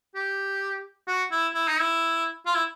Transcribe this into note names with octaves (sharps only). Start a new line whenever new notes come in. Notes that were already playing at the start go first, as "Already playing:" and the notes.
G4
F#4
E4
E4
D#4
E4
F4
E4